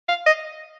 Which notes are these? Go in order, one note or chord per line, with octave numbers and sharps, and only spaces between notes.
F5
D#5